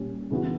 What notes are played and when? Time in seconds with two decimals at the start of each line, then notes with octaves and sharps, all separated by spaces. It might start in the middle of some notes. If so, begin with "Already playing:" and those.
Already playing: A#2 G3 C#4 G4
0.31 C#3 E3 B3 F#4